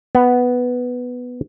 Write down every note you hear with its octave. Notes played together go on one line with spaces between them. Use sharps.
B3